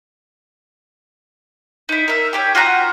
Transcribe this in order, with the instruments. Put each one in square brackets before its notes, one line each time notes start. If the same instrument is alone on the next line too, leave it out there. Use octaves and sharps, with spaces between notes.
[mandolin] D#4 E4
A#4 E5
G4 C#5 G5
F4 F#4 F#5 A#5